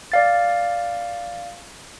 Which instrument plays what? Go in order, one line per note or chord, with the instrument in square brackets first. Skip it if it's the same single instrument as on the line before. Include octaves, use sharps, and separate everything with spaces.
[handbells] D5 F5 A6